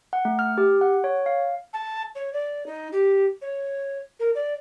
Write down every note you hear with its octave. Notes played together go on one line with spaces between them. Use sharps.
F#5
A3
F6
G4
F#5
C#5
F5
A5
C#5
D5
D#4
G4
C#5
A#4
D5